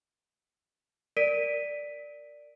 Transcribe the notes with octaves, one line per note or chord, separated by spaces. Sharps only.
A#4 D5 B6 D7 D#7